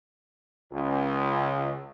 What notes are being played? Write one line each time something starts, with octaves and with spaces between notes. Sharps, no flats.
C#2